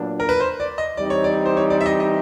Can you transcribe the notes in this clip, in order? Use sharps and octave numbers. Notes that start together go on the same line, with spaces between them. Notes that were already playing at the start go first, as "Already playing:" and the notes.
Already playing: A#2 F#3 B3 D4
A#4
B4
C5
D5
D#5
E3 G3 C4 D#4 D5
C#5
D5
C5
C#5
D5
E5
D#5
D#5